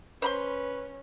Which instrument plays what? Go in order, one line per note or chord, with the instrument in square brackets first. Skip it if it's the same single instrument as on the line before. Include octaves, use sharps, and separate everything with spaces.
[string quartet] C#4 [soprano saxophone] B4 [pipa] C5 B5 C6